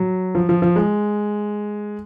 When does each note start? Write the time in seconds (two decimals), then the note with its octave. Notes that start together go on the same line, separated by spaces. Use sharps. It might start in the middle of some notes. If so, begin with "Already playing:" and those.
Already playing: F#3
0.35 F3
0.49 F3
0.62 F3
0.76 G#3